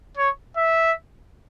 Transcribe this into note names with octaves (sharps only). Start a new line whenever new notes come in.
C#5
E5